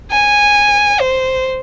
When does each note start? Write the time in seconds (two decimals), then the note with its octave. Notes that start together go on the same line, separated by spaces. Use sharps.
0.11 G#5
1.00 C5